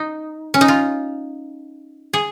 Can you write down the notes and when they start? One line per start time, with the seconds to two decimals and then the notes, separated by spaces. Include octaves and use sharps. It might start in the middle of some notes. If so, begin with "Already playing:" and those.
Already playing: D#4
0.54 C#4
0.61 D#4
0.68 F4
2.13 G#4